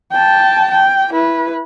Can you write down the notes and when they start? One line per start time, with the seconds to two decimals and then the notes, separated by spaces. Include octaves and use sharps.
0.12 G5 A5
0.71 G5
1.13 E4 B4